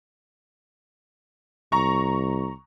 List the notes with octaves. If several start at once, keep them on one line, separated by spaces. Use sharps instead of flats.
C2 A#5 C#6